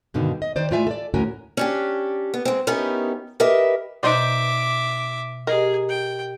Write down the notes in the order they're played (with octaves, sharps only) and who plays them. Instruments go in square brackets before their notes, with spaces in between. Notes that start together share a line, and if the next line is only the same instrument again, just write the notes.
[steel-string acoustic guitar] G2 B2 D3 D#3
D#5
D#3 C5 D5
A2 G#3 F4 D5 E5 G#5
A4 D5
D2 A2 C#4 F#4 A#4 G#5
C#4 D4 G4
B3
G#3 C4
B3 C#4 D#4 E4 G4 A#4
G4 A#4 B4 D#5 E5
[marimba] B2 F#6 [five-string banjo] D#4 C5 D5 [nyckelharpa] E5 D6
[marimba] G4 D#5 [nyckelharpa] G#4 [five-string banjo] A#4
[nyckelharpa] G5